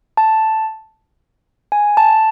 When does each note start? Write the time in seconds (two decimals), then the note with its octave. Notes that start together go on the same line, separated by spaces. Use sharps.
0.17 A5
1.72 G#5
1.97 A5